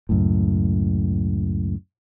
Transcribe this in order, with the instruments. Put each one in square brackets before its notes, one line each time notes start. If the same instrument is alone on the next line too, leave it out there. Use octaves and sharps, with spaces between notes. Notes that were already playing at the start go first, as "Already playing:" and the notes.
[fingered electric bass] C#2 F#2 A2